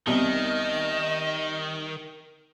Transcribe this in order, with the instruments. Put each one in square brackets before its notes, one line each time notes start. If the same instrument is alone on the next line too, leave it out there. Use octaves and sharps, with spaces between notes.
[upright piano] C2 [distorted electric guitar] D#3 [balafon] B3 C4 [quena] D#5